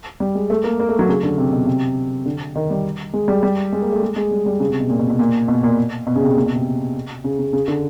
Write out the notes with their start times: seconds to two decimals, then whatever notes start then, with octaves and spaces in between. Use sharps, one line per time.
0.20 G3
0.35 G#3
0.50 A3
0.64 A#3
0.80 A#3
0.89 A3
0.99 F#3
1.08 C#3
1.23 D3
1.38 C3
1.53 B2
1.67 C3
2.26 D3
2.56 D#3
2.70 G3
3.14 G#3
3.28 G3
3.43 G3
3.72 G#3
3.82 A#3
3.92 A3
4.02 G#3
4.16 G#3
4.31 G3
4.46 G3
4.60 C#3
4.70 C3
4.80 B2
4.89 A#2
4.99 B2
5.10 B2
5.19 A#2
5.48 B2
5.63 A#2
6.07 B2
6.16 C#3
6.22 C3
6.36 A#2
6.46 B2
6.56 C3
7.24 C#3
7.39 C#3
7.53 C#3
7.68 D3